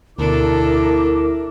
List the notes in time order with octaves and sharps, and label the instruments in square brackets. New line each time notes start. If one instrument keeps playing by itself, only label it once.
[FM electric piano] D2 B2 [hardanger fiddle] D4 A4 [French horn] E4 [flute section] A#4 D6